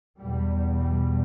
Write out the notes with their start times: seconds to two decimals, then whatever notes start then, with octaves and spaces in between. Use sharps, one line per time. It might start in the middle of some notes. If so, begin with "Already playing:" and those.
0.19 E2 B2 G3
0.80 G3